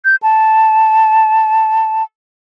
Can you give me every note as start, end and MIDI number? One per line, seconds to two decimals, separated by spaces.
0.05 0.16 91
0.23 2.03 81